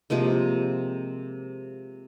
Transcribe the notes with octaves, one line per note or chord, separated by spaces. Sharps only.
C3 F3 G#3 A#3